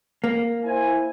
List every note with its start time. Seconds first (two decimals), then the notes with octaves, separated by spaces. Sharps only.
0.24 A#3
0.65 E4 C5 G#5